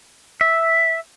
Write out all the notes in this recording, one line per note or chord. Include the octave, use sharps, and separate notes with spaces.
E5